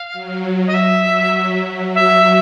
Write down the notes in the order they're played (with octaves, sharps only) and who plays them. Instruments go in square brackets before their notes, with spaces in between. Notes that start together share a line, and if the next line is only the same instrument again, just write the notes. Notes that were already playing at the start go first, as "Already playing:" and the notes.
Already playing: [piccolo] F5
[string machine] F#3
[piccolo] D#5
E5
[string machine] F#3
F#3
F#3
[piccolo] E5